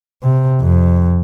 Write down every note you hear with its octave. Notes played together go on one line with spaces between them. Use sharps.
C3
F2